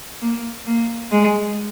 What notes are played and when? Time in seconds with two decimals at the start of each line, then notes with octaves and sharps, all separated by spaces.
0.22 A#3
0.67 A#3
1.12 G#3